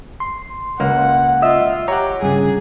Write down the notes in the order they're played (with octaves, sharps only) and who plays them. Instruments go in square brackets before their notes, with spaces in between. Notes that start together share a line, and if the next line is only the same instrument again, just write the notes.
[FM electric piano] C6
[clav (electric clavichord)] C#2 A#3 [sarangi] F#5
[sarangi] F4 [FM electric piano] D#5 E5 E6
[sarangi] G4 [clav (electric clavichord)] C#5 F#5 [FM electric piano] A#5
[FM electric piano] G2 C#3 [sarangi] G#4